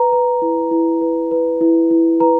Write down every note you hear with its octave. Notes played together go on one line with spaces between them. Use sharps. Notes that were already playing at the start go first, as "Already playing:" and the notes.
Already playing: B4 A#5
B4
E4
E4
B4
B4
E4
E4
B4 A#5